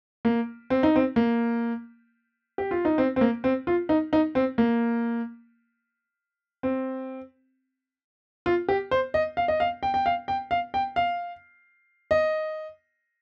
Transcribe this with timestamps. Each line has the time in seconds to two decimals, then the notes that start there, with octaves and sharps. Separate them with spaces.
0.25 A#3
0.70 C4
0.83 D#4
0.96 C4
1.16 A#3
2.58 G4
2.71 F4
2.85 D#4
2.98 C4
3.16 C4
3.21 A#3
3.44 C4
3.67 F4
3.89 D#4
4.13 D#4
4.35 C4
4.58 A#3
6.63 C4
8.46 F4
8.68 G4
8.91 C5
9.14 D#5
9.37 F5
9.48 D#5
9.60 F5
9.83 G5
9.94 G5
10.06 F5
10.28 G5
10.51 F5
10.74 G5
10.96 F5
12.11 D#5